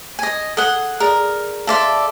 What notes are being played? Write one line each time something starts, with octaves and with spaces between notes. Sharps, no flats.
D#5 G#5
G#4 A4 F#5 D#6 G7
G#4 A#4 D5
A4 D5 E5 F5 C6